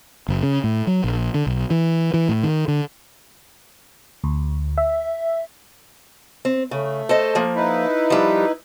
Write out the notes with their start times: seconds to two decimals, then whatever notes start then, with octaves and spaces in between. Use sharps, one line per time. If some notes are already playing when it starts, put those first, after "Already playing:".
0.28 F#1
0.43 C#3
0.64 A2
0.87 F#3
1.04 A#1
1.34 D3
1.47 B1
1.70 E3
2.14 E3
2.29 A2
2.43 D#3
2.68 D3
4.24 D2
4.78 E5
6.45 C4
6.71 C#3 A3
7.09 A4 C5 D#5
7.35 F3 A#3
7.56 D#4 E4 B4
8.10 F3 G3